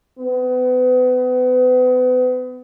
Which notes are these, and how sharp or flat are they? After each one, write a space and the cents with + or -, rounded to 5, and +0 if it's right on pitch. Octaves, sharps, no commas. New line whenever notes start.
B3 +35